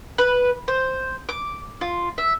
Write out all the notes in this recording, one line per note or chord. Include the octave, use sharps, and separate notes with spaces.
B4
C5
D6
F4
E5